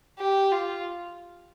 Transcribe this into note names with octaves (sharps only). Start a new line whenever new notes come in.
G4
F4